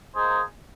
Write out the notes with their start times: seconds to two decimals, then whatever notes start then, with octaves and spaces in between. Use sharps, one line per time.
0.15 A#3 D#4 G#4 C5